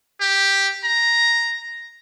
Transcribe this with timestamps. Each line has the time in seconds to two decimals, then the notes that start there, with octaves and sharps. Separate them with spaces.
0.21 G4
0.84 A#5